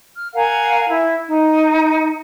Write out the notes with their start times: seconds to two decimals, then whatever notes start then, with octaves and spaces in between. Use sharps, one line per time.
0.15 F6
0.34 A#4 F5 F#5 G#5
0.87 E4
1.29 D#4